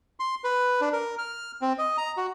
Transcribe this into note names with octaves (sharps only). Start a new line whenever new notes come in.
C6
B4
D4
A#4
F6
C4
D#5
A#5
F#4